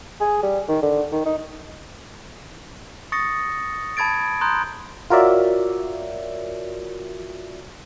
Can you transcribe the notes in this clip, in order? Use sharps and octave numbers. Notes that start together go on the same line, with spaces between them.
G#4
G3
D#3
D3
D#3
D#4
C#6 D#6 A6 A#6 C#7
A5 B5 G#6 A6 D7
A#5 C6 D#6 F#6 G6
F4 F#4 A#4 C#5 D5 E5